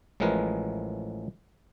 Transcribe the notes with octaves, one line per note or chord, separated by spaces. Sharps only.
A1 A2 F3 G#3 A#4 B4